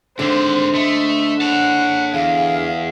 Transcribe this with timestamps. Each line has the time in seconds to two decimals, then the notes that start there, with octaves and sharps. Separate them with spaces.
0.19 G#2 D3 C4 C5
0.75 A3 D#5
1.41 C#5 F#5 A5
2.14 E2 G#4 F5